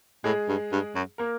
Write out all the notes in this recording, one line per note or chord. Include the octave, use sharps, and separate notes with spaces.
A2 G#3 G#4
G2
G2
F#2
A#3 A#4